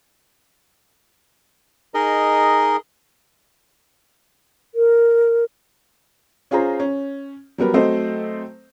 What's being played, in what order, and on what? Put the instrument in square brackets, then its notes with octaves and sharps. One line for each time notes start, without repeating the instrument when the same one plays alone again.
[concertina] D#4 G#4 A#4 D#5
[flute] A#4
[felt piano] C#4 F4 G#4 C5 A#5
C#4
F#3 G3 B3 A#4
F#3 A3 C4 A4 C5 D#5